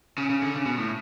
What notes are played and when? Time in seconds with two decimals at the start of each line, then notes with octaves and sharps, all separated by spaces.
0.18 C#3
0.30 C#3
0.42 D3
0.54 C#3
0.66 B2
0.78 A2